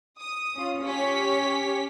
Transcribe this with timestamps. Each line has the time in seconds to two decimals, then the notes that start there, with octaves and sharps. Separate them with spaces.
0.19 D#6
0.54 C#4 F4
0.85 C#4 G4 C#5 B6